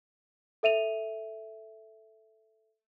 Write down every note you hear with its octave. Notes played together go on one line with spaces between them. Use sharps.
A4 E5 D#7 F7